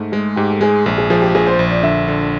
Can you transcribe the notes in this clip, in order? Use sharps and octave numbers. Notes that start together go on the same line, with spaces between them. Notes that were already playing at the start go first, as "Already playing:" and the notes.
Already playing: G#2 A3
G#3 G#4
G#2 G4
A4
G#3 G#4
A#1 G#4
G#4
F3 G#4
G4
A#1 G#4
C5
A#1
D5
D3 E5
D3